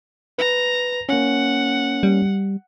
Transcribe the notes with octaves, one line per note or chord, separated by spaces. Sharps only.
B4 A#5
A#3 C#4 F#5
G3